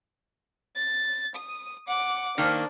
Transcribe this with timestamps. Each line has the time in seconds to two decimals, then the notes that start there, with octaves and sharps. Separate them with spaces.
0.76 A6
1.35 D#6
1.88 F#5 D6
2.38 D#3 A#3 D4 C5